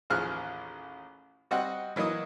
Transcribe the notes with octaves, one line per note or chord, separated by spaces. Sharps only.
A1 D#2 F3 G#4 F6 F#6
G3 C4 F#4 D#5 F#5
E3 F#3 A#3 D#5 D#6